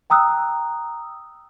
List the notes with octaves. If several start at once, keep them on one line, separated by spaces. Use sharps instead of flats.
G5 A#5 D#6 E6 F#6